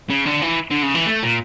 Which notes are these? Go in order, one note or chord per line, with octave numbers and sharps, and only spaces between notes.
C#3
D3
E3
D3
C#3
E3
A3
A#2